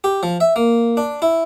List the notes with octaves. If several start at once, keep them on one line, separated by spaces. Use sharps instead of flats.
G4
F3
E5
A#3
D4
E4